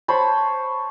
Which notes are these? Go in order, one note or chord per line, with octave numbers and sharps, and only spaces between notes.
C5 C#5 A5 B5